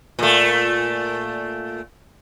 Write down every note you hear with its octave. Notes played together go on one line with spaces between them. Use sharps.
A#2 A3